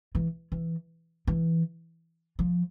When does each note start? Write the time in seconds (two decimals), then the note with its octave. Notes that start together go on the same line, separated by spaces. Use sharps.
0.15 E3
0.52 E3
1.27 E3
2.39 F3